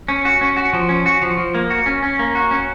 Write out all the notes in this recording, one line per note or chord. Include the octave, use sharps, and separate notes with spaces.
C#4
F#4
C#4
F#4
F3
C#4
F#4
F3
F3
A#3
F#4
C#4
C#4
A#3
F#4
C#4